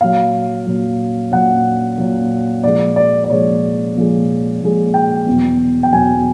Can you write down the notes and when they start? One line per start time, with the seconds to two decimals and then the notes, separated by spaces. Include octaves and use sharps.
0.01 A#2 F#3 F5
0.66 A#2 F#3
1.32 A#2 F#3 F#5
1.98 A#2 F#3
2.63 A#2 F3 G#3 D5
2.96 D5
3.24 D5
3.29 A#2 F3 G#3 C#5
3.96 A#2 F3 G#3
4.61 A#2 F3 G#3
4.94 G5
5.26 E2 B2 F#3
5.83 G5
5.93 E2 B2 F#3 G#5